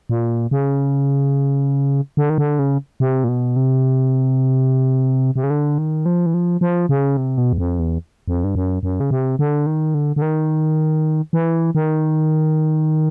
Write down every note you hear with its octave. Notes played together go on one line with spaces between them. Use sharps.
A#2
C#3
D3
D#3
D3
C#3
C3
A#2
B2
C3
C3
C#3
D3
D#3
F3
E3
F3
F3
C#3
C3
B2
E2
F2
E2
F2
G2
F#2
F#2
C#3
C3
D3
D#3
D3
D3
D#3
E3
D#3